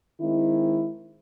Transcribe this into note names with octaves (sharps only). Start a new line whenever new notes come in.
D#3 G#3 C4 E4